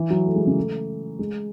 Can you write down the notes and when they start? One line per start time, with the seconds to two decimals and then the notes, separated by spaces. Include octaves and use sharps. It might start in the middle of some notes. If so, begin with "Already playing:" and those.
Already playing: E3
0.10 F#3
0.26 A3
0.35 G#3
0.47 C#3
0.57 A3
1.19 G#3